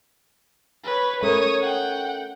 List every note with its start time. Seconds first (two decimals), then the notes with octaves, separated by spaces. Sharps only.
0.84 B4 C#5
1.23 A3 C#4 A#4 C#5 D#6
1.61 F#5 G5